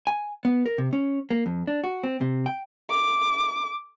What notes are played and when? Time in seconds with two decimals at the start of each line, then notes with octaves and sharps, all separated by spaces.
0.07 G#5
0.45 B3
0.66 A#4
0.78 C3
0.93 C#4
1.30 A#3
1.46 F2
1.67 D4
1.84 F#4
2.04 C4
2.21 C3
2.46 G5
2.90 D6